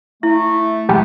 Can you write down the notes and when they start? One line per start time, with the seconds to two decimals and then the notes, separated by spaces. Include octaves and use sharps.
0.23 A3 E4
0.89 B1 E2 G#3 G4 F#5